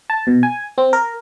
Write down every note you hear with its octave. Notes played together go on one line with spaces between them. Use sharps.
A5
B2
G#5
C4
A#4